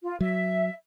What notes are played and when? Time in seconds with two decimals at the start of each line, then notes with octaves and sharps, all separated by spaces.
0.03 F4
0.21 F#3 E5